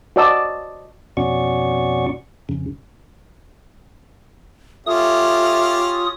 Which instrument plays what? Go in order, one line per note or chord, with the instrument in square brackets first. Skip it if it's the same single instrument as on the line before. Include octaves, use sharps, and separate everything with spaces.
[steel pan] F#4 C5 D5 D#5 A5 E6
[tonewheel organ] F2 B2 C#4 F#4 D5 C#6
F2 C#3
[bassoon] A3 [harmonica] C#4 G4 F5 [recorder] F4 [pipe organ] D#6